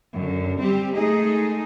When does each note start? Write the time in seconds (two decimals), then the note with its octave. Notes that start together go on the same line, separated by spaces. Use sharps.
0.13 F#2 D3
0.60 G3 C4 G4
0.95 G#3 A3 D#4 G#4 D#5